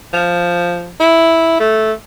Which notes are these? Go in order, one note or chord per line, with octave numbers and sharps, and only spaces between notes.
F3
E4
A3